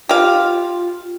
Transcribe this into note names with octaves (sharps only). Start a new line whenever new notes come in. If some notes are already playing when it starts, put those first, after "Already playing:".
F4 G4 F5